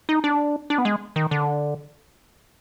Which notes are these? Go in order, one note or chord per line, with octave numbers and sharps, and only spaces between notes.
D#4
D4
D4
B3
G#3
D#3
D3